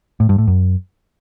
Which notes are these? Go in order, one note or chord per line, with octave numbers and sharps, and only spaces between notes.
A2
G2
A2
F#2